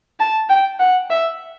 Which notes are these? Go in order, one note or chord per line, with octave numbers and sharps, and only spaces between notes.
A5
G5
F#5
E5